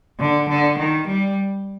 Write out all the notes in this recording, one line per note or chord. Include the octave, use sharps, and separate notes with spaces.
D3
D3
D#3
G3